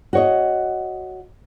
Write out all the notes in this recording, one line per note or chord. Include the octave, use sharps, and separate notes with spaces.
F#4 C#5 D#5